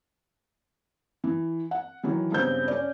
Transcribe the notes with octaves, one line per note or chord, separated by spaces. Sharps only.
E3
F#5
D#3 E3 F#3
G2 C#3 B3 C4 G6
C#4 D5